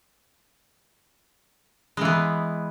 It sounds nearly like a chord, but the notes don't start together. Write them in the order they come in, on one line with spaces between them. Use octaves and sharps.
G#3 E3 B3